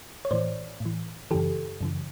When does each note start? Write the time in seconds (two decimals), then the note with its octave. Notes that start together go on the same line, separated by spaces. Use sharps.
0.25 C#5
0.31 A2 E3 C5 D5
0.80 A2
0.86 E3
1.31 F#2 C#3 E3 G4 A4
1.81 F#2 C#3 E3